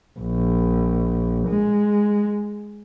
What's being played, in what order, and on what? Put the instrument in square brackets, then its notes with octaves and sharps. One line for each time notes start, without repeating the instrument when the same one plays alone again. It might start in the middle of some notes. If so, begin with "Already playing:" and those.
[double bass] A#1
G#3